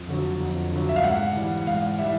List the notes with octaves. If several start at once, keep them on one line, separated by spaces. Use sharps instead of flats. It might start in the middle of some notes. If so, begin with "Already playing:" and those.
Already playing: F2
D3 F#3
F2
D3 F#3
E5
F5
G#2 F#5
E3 G3
G#2 F5
E3 G3 E5